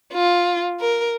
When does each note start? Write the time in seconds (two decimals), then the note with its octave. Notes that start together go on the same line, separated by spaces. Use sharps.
0.13 F4
0.80 A#4